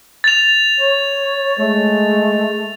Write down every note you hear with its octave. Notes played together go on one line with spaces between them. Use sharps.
A6 F7
C#5
G#3 A3